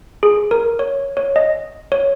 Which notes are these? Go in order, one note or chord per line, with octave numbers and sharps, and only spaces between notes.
G#4
A#4
C#5
C#5
D#5
C#5